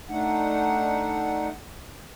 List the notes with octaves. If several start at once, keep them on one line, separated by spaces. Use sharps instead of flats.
A3 D4 D#4 F#5